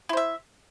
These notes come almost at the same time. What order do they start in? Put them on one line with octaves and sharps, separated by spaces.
E4 C5 E5